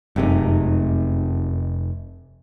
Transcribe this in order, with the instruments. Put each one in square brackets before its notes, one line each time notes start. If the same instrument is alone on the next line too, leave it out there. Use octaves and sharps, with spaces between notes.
[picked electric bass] F1 C3 [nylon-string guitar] F#2 G#3 D#4